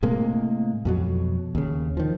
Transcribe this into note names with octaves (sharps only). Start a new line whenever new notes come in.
A2 C3 G#3 A#3
F2 B2 F#3
D#2 C#3
D#3 F3